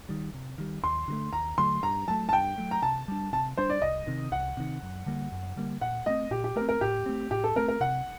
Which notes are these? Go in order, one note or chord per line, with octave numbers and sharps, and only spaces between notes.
D#3 G3
C3
D#3 G3
D#2 C6
D3 F#3 A3
D#2 A#5
D3 F#3 A3 C6
G2 A#5
F#3 A3 A5
A5
G2 G5
F#3 A3
A#5
C3 A5
G3 D4
C3 A5
G3 D4 C5
D5
C2 D#5
C3 D#3
C2 F#5
C3 D#3
F#2
D3 G3 A#3
F#2
D3 G3 A#3
A#2 F#5
A3 C4 D#5
A#2 G4
G4
A3 A#4
C4
A#4
A2 G4
A3 C4
A2 G4
A4
A3 C4 A#4
A#4
C3 F#5